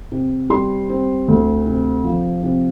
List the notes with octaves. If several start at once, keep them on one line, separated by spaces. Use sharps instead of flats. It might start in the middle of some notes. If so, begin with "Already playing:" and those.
C3
G3 C6
C4
D2
C3
F3
C3